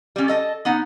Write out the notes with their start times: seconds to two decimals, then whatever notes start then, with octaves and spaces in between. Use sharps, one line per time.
0.16 G3 C#4
0.28 A4 D#5 A5
0.65 B3 D#4 F#5